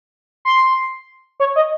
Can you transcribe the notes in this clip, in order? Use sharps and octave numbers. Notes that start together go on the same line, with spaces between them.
C6
C#5
D#5